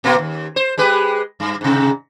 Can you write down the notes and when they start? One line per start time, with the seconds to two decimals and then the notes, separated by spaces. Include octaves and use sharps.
0.04 A#2 A#3 B3
0.19 D#2
0.56 C5
0.78 G#3 G4 B4
1.40 G2
1.61 G#2 C3